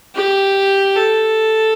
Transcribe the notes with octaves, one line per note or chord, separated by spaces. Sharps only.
G4
A4